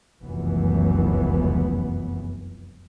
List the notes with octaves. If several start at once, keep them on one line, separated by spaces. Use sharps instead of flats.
F1 C#2 F#2 E3 B3